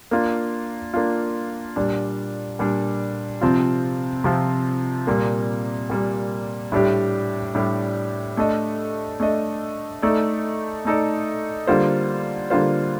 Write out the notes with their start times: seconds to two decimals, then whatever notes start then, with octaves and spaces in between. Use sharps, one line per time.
0.11 A#3 D4 F4
0.94 A#3 D4 F4
1.76 A#2 G3 D4
2.59 A#2 G3 D4
3.41 C3 F3 C4 F4
4.24 C3 F3 C4 F4
5.07 A#2 G3 A#3
5.90 A#2 G3 A#3
6.72 A2 G3 D4 G4
7.55 A2 G3 D4 G4
8.37 A3 D4 A4 D#5
9.20 A3 D4 A4 D#5
10.02 A3 D#4 A4 D5
10.85 A3 D#4 A4 D5
11.67 D3 G3 A#3 F4 C5
12.50 D3 G3 A#3 F4 C5